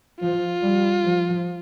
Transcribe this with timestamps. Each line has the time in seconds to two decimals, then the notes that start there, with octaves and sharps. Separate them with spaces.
0.20 F3 F4
0.62 G3
1.06 F3